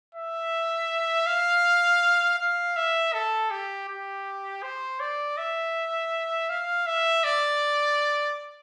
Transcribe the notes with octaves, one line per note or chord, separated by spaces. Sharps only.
E5
F5
F5
E5
A4
G4
G4
C5
D5
E5
F5
E5
D5